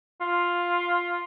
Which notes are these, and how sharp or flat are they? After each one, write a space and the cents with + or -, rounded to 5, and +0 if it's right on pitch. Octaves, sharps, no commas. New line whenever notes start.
F4 +5